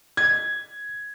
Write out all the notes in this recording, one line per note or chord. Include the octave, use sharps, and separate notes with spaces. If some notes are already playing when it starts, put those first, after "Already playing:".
G#6